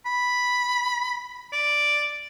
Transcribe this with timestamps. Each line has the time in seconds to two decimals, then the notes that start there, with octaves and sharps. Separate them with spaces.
0.06 B5
1.53 D5